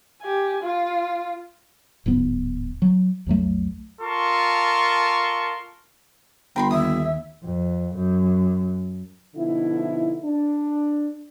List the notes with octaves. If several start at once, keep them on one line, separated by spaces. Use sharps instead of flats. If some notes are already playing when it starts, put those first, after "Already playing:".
G4 G#5
F4
D1 G#2 B3
F#3
B1 F2 F#3 A3
F4 A4 A#4 A5 C6 C#6
G1 A#4 G5 B5 C6
D#2 E5 D#6
F2
F#2
B2 D3 F3 D#4 E4
D4